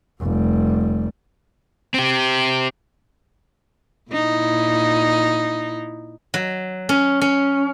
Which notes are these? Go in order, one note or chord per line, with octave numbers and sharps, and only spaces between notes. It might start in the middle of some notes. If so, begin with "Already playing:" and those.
F1 G3
C4 G4
A#2 D#4 E4
F#3
C#4
C#4